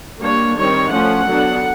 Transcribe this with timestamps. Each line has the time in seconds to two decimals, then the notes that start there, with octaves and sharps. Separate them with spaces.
0.22 G3 A#3 D4 C#5
0.57 D#3 G3 C4 C#5
0.92 F3 A3 C#4 F#5
1.27 D3 F#3 B3 D4